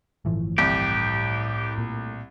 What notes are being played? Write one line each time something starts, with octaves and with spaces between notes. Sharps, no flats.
G1 A2 E3 F3
C2 G4
A#2